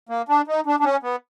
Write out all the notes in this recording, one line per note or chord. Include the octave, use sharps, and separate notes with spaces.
A#3
D4
D#4
D4
D4
C#4
B3